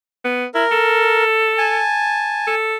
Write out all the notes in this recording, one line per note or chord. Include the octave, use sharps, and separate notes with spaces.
B3
E4 A#4
A4
G#5 A5
A4